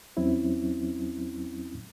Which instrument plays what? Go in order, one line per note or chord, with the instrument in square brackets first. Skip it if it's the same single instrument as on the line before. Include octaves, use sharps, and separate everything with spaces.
[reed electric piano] E2 F#3 C4 C#4 E4